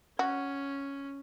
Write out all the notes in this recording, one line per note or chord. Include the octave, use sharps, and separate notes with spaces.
C#4 F#4